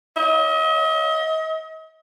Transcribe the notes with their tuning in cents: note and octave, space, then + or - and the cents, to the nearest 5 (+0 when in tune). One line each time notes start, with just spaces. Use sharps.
D#5 +40